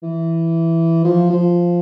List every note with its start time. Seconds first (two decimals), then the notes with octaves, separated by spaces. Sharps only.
0.03 E3
1.04 F3
1.30 F3